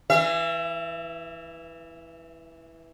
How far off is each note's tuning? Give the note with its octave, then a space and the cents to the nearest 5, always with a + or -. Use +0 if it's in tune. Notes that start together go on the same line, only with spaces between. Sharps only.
E3 -5 E5 +40